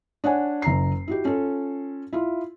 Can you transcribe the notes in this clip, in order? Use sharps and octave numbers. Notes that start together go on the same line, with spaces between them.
D4 C#5 F#5 G#5
F#1 A#5 C7
E4 F#4 G4
C#4 F4 A4
E4 F4